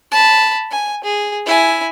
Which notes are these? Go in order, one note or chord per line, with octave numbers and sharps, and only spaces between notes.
A5 B5
G#5
G#4
E4 G#5